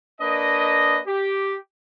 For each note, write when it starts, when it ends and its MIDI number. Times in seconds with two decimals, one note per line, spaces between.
0.21 0.99 58
0.21 0.99 62
0.21 0.99 71
0.21 0.99 75
1.07 1.56 67